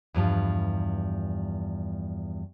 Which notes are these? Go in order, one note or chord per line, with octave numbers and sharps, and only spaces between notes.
E2 G2 F3